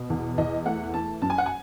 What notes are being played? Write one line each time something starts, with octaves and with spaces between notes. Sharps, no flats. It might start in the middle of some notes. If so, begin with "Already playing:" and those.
Already playing: B2
E2
E2 D#5
A3 F#5
E3 A5
F#2 A5
G#5
F#5
G#5